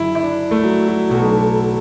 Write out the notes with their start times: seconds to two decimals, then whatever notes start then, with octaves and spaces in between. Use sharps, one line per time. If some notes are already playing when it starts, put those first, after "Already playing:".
Already playing: F#1 F#2 D3 E4
0.15 E4
0.23 D4
0.51 A3
0.63 F#3
0.88 F#3
1.09 B1 B2 A3 F#4